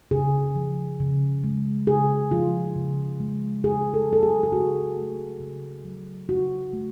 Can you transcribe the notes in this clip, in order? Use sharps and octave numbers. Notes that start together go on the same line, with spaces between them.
C#3 G#4
F3
C#3
G#3
C#3 G#4
F3 F4
C#3
G#3
C#3 G#4
A4
F#3 A4
G#4
G#4
C#3 F#4
A3
C#3
F#3
C#3 F#4
A3